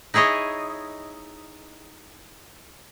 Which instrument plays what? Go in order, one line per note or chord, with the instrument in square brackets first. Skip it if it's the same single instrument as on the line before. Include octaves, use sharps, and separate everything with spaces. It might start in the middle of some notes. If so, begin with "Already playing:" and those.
[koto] D#4 E4 G#4 C#5 D#5